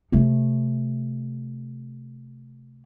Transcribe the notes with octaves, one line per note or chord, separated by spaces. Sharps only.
C3 A3